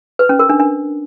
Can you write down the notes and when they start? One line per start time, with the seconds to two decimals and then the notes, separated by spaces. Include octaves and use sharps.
0.19 B4
0.29 C#4
0.39 A#4
0.49 D4
0.60 D4